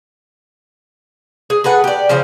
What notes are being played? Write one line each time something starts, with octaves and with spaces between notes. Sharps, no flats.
G#4
G#4 A4 B4 F#5
G4 D5
C#3 F3 C4 C#4